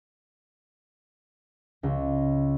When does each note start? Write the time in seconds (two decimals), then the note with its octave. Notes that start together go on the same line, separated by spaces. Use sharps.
1.83 C#2